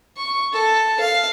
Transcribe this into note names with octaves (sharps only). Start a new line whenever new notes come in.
C#6
A4
F5